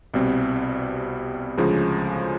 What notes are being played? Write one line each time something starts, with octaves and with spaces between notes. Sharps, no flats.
C2 B2 G3 C4
D2 C#3 F3 G#3